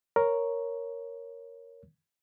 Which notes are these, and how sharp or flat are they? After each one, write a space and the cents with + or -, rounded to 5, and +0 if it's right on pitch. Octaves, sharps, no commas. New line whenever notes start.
A#4 +0 C#5 +0